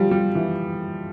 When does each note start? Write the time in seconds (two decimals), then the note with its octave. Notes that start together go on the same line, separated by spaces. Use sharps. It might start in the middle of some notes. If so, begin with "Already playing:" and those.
Already playing: F3 G3
0.11 G3
0.35 E3